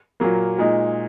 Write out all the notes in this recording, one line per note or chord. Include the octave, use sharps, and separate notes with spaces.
A#2 F#3 A#3
A#2 G#3 D#4